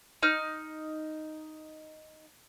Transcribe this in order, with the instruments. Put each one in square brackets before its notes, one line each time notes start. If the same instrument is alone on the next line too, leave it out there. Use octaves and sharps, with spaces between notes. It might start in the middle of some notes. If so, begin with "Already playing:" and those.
[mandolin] D#4 F6